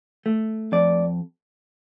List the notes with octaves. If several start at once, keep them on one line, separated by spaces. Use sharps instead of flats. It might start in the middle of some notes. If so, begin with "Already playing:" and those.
A3
F2 D5